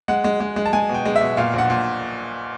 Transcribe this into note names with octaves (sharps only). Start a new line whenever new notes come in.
G#3 F#5
G#3
G#3
G#3
A5
G#3 G#5
B2
G5
G#3
E5
B2
A#2 F5
A#1
F#5
A#2